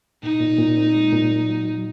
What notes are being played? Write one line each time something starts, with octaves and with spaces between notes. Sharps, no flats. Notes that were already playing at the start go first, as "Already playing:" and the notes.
A#2 D#4
A#2
A#2
C4
G#3
A#2
F#3
F#3
F#3